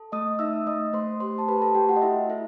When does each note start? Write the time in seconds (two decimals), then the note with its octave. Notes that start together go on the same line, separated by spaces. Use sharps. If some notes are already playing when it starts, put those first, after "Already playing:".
Already playing: A4
0.12 A3 D#5 D#6
0.39 D#4 E5 E6
0.66 A3 D#5 D#6
0.93 A3 C5 C6
1.20 G4 C5 C6
1.38 A5
1.48 G4 B4 B5
1.62 A4 A5
1.74 A3 G4 G5
1.89 F#4 F#5
1.96 D#5
2.02 E4 A4 E5
2.29 E4 A4 E5